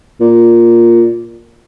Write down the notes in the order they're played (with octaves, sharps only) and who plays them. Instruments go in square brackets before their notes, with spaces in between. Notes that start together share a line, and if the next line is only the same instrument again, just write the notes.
[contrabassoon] A#2